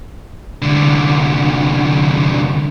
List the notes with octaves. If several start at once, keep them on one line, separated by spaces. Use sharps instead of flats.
C2 D3